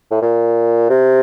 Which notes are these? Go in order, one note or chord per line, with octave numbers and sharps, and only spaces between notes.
A2
A#2
C3